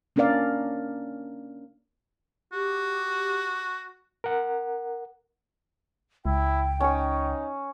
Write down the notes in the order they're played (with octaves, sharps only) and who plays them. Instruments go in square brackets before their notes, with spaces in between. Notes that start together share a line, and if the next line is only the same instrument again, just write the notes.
[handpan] A#3 C#4 D4 A#4 D5 F5
[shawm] F#4 [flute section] G4
[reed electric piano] A#4 F#5
[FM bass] C#2 [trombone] E4 [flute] G5
[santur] C#4 C#6 [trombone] D#4